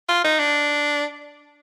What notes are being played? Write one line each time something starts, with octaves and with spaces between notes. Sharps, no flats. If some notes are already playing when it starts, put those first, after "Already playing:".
F4
D#4
D4